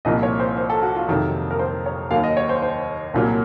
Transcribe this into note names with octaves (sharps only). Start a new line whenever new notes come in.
C2 A#2 F3 D#5
C#5
C5
C5
A4
F#4
F4
F2 C3 D#3 F#3
A#4
C5
C#5
D#2 D#3 F#3 F5
D#5
C#5
C5
C5
C2 A#2 F#3